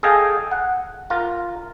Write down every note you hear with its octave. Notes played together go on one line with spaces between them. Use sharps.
G#4 A4 D#5 F5 G5 G#5
F#5
F4 A#4